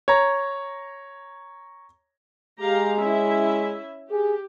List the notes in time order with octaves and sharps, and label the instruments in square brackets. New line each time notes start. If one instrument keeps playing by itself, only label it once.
[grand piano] C#5 A#5
[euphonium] G#3 [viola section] G4 F5 A#5
[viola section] C#4 E4 E5
[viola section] G4 [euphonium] G#4